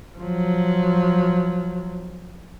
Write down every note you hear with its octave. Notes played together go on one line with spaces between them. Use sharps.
F3 F#3